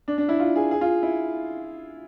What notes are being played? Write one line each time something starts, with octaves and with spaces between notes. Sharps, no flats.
D4
D4
E4
F4
G#4
G#4
F4
E4